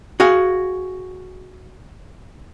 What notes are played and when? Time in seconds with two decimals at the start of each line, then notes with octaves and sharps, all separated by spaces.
0.20 F#4 G#4 F5